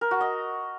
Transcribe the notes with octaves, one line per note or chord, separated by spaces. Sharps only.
A#4
F#4
D#5